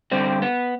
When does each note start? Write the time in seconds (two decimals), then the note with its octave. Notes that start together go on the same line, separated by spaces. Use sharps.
0.11 G2 D3 G3 C4
0.42 B3